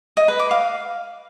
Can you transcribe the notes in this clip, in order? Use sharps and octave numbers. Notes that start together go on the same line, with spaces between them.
D#5
B4
D6
F5